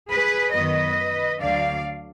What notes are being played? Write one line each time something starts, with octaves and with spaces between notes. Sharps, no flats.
G#4 B4
F#2 D#3 F#3 B3 B4 D#5
D2 D3 F#3 D5 F5